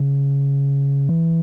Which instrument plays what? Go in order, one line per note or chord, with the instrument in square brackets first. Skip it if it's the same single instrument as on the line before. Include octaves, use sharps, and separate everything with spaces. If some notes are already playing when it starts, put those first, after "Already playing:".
Already playing: [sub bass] C#3
E3